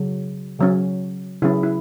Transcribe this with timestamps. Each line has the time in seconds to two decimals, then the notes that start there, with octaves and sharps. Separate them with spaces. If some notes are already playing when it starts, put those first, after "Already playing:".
Already playing: C#3 F#3
0.59 C#3 F#3 C#4
1.42 C#3 F#3 C#4 E4 G#4
1.63 E4